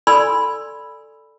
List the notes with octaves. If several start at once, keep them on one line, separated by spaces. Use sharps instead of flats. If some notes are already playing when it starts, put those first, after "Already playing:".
A4 D5 G#5 B5 C6 E6